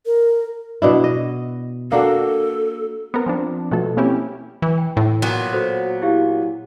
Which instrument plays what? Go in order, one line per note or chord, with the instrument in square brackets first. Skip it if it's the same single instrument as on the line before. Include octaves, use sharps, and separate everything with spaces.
[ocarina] A#4
[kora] B2 D4 E4
D#5
[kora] A#3 D4 F#4 [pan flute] A4
[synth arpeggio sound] B3 C4 A#4
F3 C4 D4
B2 F3 A3 F#4 A4
A#3 C4 C#4 E4 G4
[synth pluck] E3
[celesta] G5
[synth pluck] A2
[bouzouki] A#2 F#3 B3
[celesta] F#4 A4 C5
E4 G4 F5